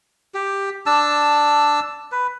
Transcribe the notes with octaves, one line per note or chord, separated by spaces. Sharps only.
G4
D4 A5 E6
B4